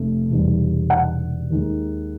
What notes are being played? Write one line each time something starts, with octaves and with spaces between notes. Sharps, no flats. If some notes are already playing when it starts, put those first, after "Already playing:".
Already playing: F1 A3
E1 E2 C3 D#3 G3
F#5
D#2 D#3 G#3